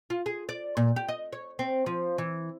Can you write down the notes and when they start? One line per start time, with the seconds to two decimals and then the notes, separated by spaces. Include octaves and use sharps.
0.10 F4
0.26 G#4
0.49 D5
0.77 A#2
0.96 G4
1.08 D#5
1.33 C#5
1.59 C4
1.86 F3
2.18 E3